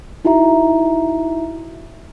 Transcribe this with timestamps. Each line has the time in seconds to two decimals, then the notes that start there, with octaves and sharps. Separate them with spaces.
0.25 D#4 E4 F#4 E5 A#5